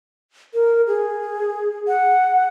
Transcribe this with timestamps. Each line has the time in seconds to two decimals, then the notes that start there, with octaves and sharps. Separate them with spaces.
0.54 A#4
0.87 G#4
1.88 F#5